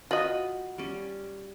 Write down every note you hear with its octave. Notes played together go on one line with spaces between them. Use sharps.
F4 F#4 D#5 B5
G3 C#4